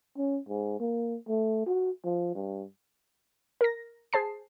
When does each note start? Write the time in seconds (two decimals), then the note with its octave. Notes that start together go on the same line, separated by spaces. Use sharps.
0.17 C#4
0.49 G#2
0.80 A#3
1.28 A3
1.66 F#4
2.05 F3
2.35 G2
3.61 A#4 A#6
4.13 G#4 C5 A5 C7